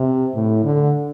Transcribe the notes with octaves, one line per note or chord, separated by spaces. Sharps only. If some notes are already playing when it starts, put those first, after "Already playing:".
Already playing: C3
A2
D3